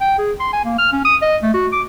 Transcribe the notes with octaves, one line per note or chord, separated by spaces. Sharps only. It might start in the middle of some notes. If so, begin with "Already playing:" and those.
G5
G#4
C6
G#5
A#3
F6
C#4
D#6
D#5
A3
F#4
D6